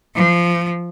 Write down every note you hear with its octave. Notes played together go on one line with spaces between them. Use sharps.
F3